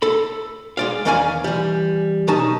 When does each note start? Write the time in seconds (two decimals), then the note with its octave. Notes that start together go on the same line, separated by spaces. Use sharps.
0.02 A4 B5
0.77 G#3 D5 F5
1.05 E2 D#3 C#4 D5 F5 G#5
1.44 E3 G3
2.28 B1 D#3 C#4 D#4 A5